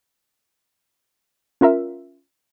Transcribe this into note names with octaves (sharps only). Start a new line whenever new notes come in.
C#4 F4 A#4 E5